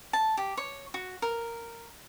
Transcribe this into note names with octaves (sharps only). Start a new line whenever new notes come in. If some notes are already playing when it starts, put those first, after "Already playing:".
A5
G4
C#5
F#4
A#4